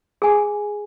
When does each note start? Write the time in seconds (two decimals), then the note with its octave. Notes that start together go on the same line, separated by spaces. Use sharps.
0.22 G#4 G#5